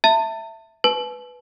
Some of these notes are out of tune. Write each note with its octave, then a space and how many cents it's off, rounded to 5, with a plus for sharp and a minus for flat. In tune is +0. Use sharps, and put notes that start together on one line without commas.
E5 +0 A5 +40
B4 +0 A5 -40